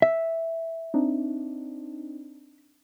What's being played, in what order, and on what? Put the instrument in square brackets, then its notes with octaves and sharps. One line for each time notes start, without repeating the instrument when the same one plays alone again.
[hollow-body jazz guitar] E5
[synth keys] C4 D4 D#4